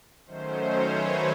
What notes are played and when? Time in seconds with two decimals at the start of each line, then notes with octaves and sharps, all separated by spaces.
0.25 D#3 F#3 A3 C#4 C5
0.57 C#5
0.89 B4